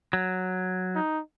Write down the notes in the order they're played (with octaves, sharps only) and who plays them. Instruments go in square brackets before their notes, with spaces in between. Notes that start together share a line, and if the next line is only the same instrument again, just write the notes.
[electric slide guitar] F#3
[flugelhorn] D#4